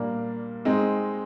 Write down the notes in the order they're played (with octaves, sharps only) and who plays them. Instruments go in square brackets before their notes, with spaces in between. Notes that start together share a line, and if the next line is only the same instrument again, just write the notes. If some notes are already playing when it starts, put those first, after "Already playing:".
Already playing: [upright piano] A#2 G3 A#3 D4
G#3 C4 D#4